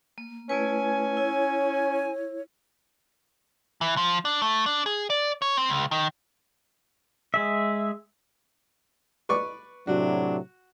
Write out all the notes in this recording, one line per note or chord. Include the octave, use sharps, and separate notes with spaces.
A#3
A3 C#4 E4 B4 G#5
E4 C#5
E3
F3
D4
A3
D4
G#4
D5
C#5
C4
C#2
D#3
G#3 G#4 E5
B4 D5 C#6
A2 C3 F#3 D4 F#4